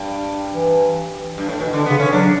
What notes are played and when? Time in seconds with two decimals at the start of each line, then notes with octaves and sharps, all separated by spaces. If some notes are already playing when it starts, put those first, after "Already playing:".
Already playing: G2
0.53 E3
1.38 G2
1.49 A2
1.60 B2 E3
1.73 D3
1.86 C#3 B3
1.97 D3 C#4
2.05 E3
2.13 F#3 D4